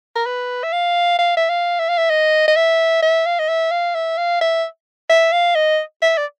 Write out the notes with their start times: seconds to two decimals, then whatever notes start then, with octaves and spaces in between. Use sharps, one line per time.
0.16 A#4
0.26 B4
0.64 E5
0.73 F5
1.19 F5
1.37 E5
1.50 F5
1.80 E5
1.89 F5
1.98 E5
2.10 D#5
2.48 D#5
2.57 E5
3.02 E5
3.26 F5
3.40 D#5
3.49 E5
3.71 F5
3.95 E5
4.18 F5
4.41 E5
5.09 E5
5.32 F5
5.55 D#5
6.02 E5
6.18 D5